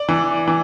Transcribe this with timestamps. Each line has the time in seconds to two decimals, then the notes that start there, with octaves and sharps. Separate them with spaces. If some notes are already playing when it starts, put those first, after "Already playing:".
Already playing: D5
0.09 E3
0.48 E3